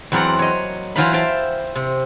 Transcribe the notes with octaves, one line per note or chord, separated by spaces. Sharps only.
E2 F#3 C4 A#4 D5 F#5
C#5 D#5
E3 F#3 F4 C5 F5 B5
C5 E5 F5 G5 A5 C6
C3